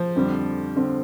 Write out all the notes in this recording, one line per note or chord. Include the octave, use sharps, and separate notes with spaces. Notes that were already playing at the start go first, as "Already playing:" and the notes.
Already playing: F3
F2 D3 G3 C4
F2 D3 G3 C4